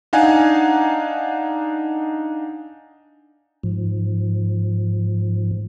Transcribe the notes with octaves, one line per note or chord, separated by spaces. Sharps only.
D4 D#4 F5 F#5 G#5
G#2 F3